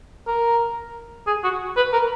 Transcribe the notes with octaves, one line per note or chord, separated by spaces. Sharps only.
A#4
G#4
F#4
B4
A#4